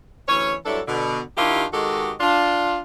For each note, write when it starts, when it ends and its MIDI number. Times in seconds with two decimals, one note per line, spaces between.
0.28 0.54 38
0.28 0.54 52
0.28 0.54 61
0.28 0.54 73
0.66 0.80 43
0.66 0.80 54
0.66 0.80 62
0.66 0.80 64
0.66 0.80 69
0.88 1.20 47
0.88 1.20 50
1.37 1.64 51
1.37 1.64 62
1.37 1.64 64
1.37 1.64 65
1.37 1.64 67
1.73 2.12 51
1.73 2.12 56
1.73 2.12 66
1.73 2.12 67
1.73 2.12 69
1.73 2.12 75
2.20 2.78 62
2.20 2.78 65